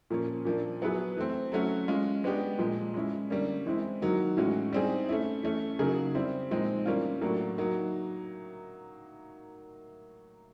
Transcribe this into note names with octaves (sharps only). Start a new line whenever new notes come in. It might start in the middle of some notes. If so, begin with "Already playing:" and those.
A#2 F3 A#3 C#4
A#2 F3 A#3 D4
F#3 B3 E4 G#4 B4
E3 A3 C4
F#3 A3 C#4 F#4
G#3 C#4 F4
G#3 B3 D4 G4
A#2 F3 G#3
G#3 C#4 E4
D3 G3 A#3 C#4
E3 G#3 C4 E4
D#3 F#3 A#3 D#4
A2 E3 G#3 C#4 F#4
G3 C4 D#4 G#4
A3 C#4 E4
E3 A3 C#4
C#3 F#3 A#3 D#4 G#4
G3 C4 E4
A#2 F3 G#3 C4 D#4
E3 G3 A#3 C#4 F4
A2 F#3 A#3 D4
F#3 A#3 D#4